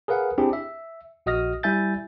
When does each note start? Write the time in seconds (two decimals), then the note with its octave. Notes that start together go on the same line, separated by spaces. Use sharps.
0.08 G#4 A#4 B4 F5 F#5
0.38 C4 D4 E4 G4 G#4
0.53 E5
1.26 A#1 F#4 D#5 D#6 F6 A#6
1.63 G3 E4 E5 G#5 G6 A6